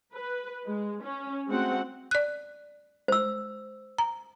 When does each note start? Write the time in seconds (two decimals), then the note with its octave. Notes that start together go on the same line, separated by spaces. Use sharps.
0.12 B4
0.66 G#3
1.02 C#4
1.48 G#3 A3 C4 F#4 F#5
2.11 D5 F#6
3.08 C5 E6
3.99 A#5